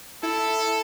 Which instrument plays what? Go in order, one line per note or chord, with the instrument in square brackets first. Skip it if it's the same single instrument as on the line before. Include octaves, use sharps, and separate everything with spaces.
[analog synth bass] E4 [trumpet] A4